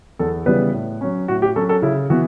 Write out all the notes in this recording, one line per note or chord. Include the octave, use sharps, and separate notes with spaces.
E2 A4
C#3 E3 G3 B3 B4
A2
F#3 C#4
A2 F#4
G4
F#3 C#4 A4
A4
C#3 E4
E3 B3 F#4